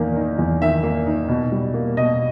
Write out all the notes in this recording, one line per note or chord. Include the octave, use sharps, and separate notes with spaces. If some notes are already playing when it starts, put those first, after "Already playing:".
Already playing: E2 D#3 A#3
D#4
E2
D#3 E5
A#3
D#4
B2
G3
A#3
B2 D#5